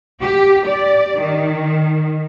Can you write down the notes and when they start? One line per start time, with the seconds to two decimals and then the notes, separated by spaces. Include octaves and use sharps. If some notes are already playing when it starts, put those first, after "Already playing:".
0.22 G4
0.66 D5
1.20 D#3